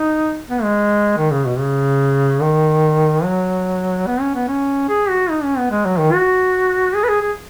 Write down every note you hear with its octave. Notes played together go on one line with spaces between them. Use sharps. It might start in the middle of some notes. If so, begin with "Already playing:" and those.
Already playing: D#4
B3
G#3
D#3
C#3
B2
C#3
D#3
F#3
B3
C#4
B3
C#4
G#4
F#4
D#4
C#4
B3
G#3
F#3
D#3
F#4
G#4
B4
G#4
G#4